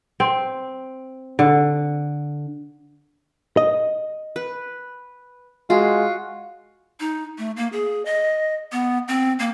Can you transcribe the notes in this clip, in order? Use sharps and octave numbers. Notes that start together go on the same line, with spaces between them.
C4
D3
D#5
B4
G#3 F4 F#4
D#4
A3
A#3
G#4
D#5
B3
C4
A#3